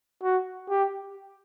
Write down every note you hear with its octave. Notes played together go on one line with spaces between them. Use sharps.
F#4
G4